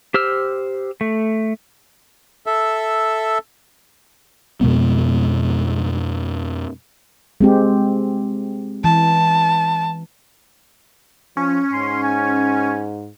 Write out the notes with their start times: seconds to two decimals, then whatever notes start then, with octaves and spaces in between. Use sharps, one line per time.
0.14 G4 C5 E6 F6
1.01 A3
2.46 A4 E5
4.61 F2 B2 G#3 B3
7.41 G#3 C4 G4
8.84 E3 A5
11.37 F3 C#4
11.73 G#2 C6
12.03 G#5